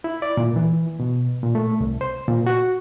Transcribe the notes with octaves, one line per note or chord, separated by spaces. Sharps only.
E4
D5
A#2
E3
B2
A#2
A3
C2
C5
A#2
F#4